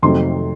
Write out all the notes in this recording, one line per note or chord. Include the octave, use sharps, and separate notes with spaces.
F2 C3 D#3 F#3 A3 C6